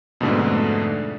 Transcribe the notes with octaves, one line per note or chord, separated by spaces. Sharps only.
F2 G#2 B2 D3 A3 D4